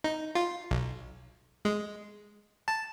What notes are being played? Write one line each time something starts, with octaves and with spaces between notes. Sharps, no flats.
D#4
F4
B1
G#3
A5